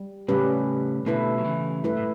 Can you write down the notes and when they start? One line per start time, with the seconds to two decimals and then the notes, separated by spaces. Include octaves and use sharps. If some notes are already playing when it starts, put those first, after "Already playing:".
Already playing: G3
0.28 A2 C#3 G3 C#4 G4 B4
1.06 B2 D3 A3 E4 B4
1.38 F#3
1.44 C#3 E3
1.84 G2 A3 E4 B4
1.97 A2